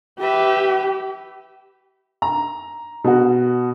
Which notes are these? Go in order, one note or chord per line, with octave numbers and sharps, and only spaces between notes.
G4 B4 E5
A#5
B2 F#4